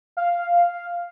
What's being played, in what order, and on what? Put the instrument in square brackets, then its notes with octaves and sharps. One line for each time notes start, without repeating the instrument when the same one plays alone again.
[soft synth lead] F5